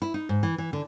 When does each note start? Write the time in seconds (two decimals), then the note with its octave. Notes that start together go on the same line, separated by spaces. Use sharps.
0.02 E4
0.14 D#4
0.29 G#2
0.43 E3
0.58 E3
0.73 D3